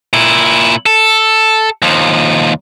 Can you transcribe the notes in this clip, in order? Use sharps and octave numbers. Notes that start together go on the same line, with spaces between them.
A#2 E4
A4
D#2 F3